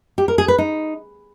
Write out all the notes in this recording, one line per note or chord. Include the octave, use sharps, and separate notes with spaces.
G4
A#4
G#4
B4
D#4